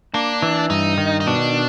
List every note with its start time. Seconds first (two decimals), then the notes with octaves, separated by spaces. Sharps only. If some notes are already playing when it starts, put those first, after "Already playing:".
0.14 A#3 D4
0.42 E3
0.70 G2 D#4
0.98 D#3
1.20 D#4
1.27 B2 D4